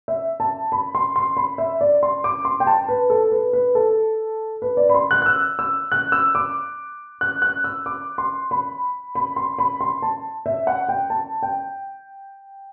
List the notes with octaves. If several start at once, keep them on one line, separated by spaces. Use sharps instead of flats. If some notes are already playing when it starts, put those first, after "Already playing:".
E5
A5
B5
C6
C6
B5
E5
D5
C6
D6
C6
G5
A5
B4
A4
B4
B4
A4
B4
D5
B5
C6
F#6
F#6
E6
E6
F#6
E6
D6
F#6
F#6
E6
D6
C6
B5
B5
C6
B5
C6
A5
E5
F#5
G5
A5
G5